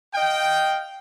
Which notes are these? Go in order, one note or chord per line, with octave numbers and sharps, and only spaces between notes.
D#5 F5 G5